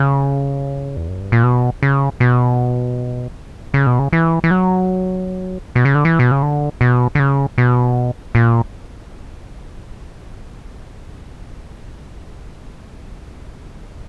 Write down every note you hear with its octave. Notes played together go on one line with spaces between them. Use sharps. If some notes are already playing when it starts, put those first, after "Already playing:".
Already playing: C#3
E2
F#2
G2
A#2
B2
C#3
B2
C#3
B2
C#3
E3
E3
F#3
B2
C#3
D3
E3
B2
C#3
D3
B2
D3
C#3
B2
A#2